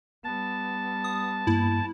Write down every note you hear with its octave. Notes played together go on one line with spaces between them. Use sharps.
G3 B3 A5
D#6
G2 A#3 E4